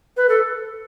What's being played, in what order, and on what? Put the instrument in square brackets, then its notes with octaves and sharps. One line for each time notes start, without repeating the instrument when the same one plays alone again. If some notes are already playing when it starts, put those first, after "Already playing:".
[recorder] B4
A4